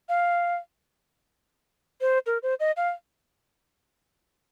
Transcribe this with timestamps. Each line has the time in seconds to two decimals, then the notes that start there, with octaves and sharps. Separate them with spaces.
0.09 F5
2.01 C5
2.26 A#4
2.43 C5
2.60 D#5
2.77 F5